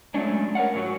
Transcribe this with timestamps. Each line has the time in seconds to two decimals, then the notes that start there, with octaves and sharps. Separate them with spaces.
0.14 F#3 G#3 A3 C#4 D4
0.55 A#4 C#5 F5 F#5
0.75 G#2 F#3 F#4